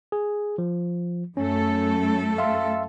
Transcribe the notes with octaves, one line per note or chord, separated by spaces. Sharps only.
G#4
F3
F#2 A3 C#4 A4
E5 F5 C6